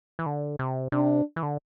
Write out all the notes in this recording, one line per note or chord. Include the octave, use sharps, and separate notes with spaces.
E3
D3
C3
C3 D4
E3
D3